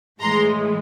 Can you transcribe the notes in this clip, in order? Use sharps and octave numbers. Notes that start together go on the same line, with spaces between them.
A2 E3 G#3 A#5 C6